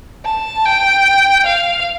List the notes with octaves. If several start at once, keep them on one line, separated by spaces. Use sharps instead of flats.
A5
G5
F5